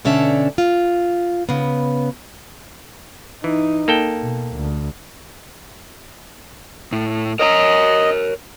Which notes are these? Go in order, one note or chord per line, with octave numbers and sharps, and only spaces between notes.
B2 D3 C#4 D5 E5 A5
F4
C#3 B3
E3 D#4
A#3 A4 G5
B2
D2
A2
A#4 C#5 D#5 A#5